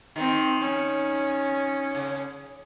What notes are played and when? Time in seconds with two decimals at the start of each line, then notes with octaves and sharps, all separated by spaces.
0.16 D#3 C4
0.61 C#4
1.95 C#3